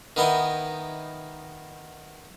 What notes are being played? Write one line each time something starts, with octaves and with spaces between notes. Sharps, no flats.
D#3 B3 D#4 E4